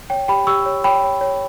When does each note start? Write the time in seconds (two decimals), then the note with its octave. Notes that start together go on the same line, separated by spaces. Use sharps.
0.10 C#5 G5
0.28 G4 G5 B5
0.47 G4 C#6 E6
0.66 C#5
0.84 C#5 G5 B5
1.04 C#5
1.21 C#5